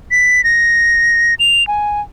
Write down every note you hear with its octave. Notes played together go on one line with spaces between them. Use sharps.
B6
A#6
F7
G#5